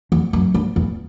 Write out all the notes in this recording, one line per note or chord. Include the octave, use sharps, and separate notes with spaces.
E2
F#2
G2
E2